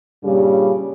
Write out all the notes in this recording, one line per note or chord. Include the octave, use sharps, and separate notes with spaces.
G2 A#2 C#3 G3